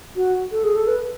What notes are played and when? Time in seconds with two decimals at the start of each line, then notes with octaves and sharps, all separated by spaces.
0.16 F#4
0.52 A4
0.64 G#4
0.76 A4
0.87 B4